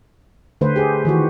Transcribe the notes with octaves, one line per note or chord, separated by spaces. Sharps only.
D3 A3 B4 C5
G4 G#4
D#3 E3 F#4